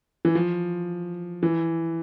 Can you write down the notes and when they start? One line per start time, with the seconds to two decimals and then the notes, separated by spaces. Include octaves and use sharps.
0.25 E3
0.35 F3
1.43 E3